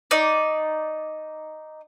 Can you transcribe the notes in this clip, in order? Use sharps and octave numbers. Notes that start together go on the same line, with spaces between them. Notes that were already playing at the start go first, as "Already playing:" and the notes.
D#4 D5